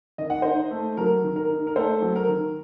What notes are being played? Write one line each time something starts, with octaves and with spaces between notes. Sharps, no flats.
D#3 D#5
F#5
D#4 C5 D#5
A3
F#3 A#4
D#3
A#4
D#4
A#4
A3 A4 C5
F#3
A#4
D#3